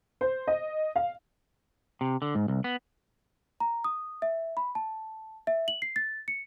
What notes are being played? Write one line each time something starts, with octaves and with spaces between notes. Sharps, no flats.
C5
D#5
F5
C3
D3
G#2
C2
B3
A#5
D#6
E5
B5
A5
E5
F#7
C7
A6
C#7